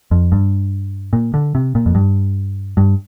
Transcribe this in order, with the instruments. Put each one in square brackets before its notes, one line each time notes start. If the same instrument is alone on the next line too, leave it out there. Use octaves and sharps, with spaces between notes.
[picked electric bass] F2
G2
A#2
D3
C3
A#2
F2
G2
G2